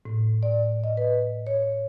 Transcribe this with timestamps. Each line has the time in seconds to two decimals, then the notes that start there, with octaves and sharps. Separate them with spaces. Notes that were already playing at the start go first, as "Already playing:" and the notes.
0.05 A2
0.43 D5
0.84 D#5
0.97 B4
1.47 C#5